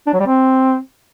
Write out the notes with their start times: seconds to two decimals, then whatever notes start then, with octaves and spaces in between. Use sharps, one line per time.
0.07 D4
0.13 F#3
0.20 G3
0.27 C4